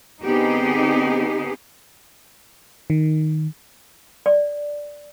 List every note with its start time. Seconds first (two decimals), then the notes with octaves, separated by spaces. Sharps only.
0.24 D3 B3 C4 D#4 G4 G#4
2.90 D#3
4.26 D5